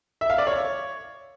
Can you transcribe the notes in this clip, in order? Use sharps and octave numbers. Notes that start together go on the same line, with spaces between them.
E5
F5
D5
C#5